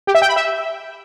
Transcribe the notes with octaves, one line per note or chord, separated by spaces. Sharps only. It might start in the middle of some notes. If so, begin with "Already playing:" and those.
G4
E5
G5
B5
E5